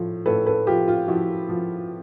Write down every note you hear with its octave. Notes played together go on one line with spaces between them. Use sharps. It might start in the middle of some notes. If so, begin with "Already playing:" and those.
Already playing: A2 F3
A2 A4 B4
A4 B4
F3 F4 G4
F4
F3 E4 F#4
F3